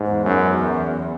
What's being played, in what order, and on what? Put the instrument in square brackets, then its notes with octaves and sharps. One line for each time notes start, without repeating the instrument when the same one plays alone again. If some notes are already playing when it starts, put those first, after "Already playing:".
Already playing: [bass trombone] G#2
[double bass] E2
[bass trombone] F#2